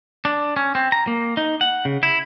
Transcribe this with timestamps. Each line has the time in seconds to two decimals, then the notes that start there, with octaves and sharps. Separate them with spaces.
0.25 D4
0.56 C#4
0.75 C4
0.92 A#5
1.07 A#3
1.37 D#4
1.61 F#5
1.85 C#3
2.03 E4